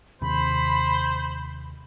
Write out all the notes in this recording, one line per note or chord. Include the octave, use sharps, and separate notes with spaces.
D#2 C3 C5 B5